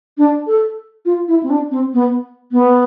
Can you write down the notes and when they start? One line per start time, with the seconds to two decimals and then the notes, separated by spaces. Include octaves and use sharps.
0.18 D4
0.47 A4
1.05 F4
1.28 E4
1.43 C4
1.50 D4
1.71 C4
1.94 B3
2.52 B3